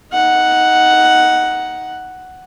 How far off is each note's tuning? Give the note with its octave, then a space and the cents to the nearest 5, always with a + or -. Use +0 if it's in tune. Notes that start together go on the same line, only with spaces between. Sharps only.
D#4 +15 F#5 +0